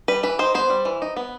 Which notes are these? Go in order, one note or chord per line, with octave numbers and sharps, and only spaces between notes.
G3 B4
E3 B4
D#4 C5
B3 C5
G3
E3
D#4
B3